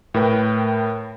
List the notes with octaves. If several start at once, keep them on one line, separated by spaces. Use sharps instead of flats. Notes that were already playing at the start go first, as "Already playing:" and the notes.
A2 A#4 B4 G5